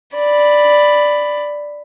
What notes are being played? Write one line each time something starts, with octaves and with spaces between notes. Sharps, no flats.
D5 B5